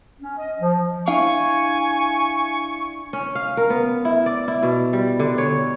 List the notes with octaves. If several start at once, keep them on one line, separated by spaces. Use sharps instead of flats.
C#4
D#5
F3
D4 E4 F5 G#5 C#6
C#4
F5
A#4
B3
E4
D5
E4
B2
G3
D3
C#5